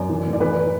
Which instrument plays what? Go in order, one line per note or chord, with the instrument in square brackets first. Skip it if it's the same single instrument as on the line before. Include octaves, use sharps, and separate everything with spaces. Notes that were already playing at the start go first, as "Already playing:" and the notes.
Already playing: [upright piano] F#2 D5
E3
A2
D5
E3 B4